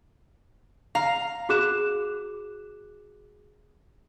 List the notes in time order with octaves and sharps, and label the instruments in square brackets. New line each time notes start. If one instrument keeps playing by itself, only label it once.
[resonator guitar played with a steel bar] F5 [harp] A#5
[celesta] F#4 G#4 D6 F#6 E7